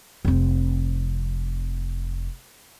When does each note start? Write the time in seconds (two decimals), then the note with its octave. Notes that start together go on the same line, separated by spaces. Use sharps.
0.25 F1 C4